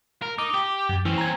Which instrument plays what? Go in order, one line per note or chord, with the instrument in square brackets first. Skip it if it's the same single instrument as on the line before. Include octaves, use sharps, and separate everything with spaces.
[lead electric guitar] A#4
[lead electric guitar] D#4 [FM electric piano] D6
[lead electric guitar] G4
[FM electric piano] F#2
[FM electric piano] E3 [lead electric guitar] C4 C#4
[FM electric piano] A#5 G#6